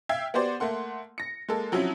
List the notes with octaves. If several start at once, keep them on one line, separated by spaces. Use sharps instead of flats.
E5 F5 G5 G#6
B3 F#4 G4 C5 D5
A3 A#3 F#5 C6
A#6 C#7
G#3 A#3 A4
F3 F#3 C4 C#4 E4